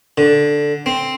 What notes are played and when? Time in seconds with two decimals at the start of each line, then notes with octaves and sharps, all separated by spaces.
0.18 D3
0.86 C4